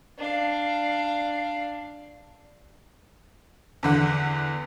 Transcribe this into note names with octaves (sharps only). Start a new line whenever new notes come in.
D4 F5
E2 D3 F#5